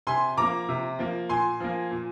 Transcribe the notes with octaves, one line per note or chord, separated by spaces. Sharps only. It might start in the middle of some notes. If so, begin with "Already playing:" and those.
C3 G#5 C6
F3 A#3 A#5 D6
C3
F3 A#3
A#2 G#5 C6
F3 A#3
A#2